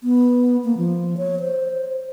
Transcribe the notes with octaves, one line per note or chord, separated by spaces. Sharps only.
B3
A#3
F3
C#5
C5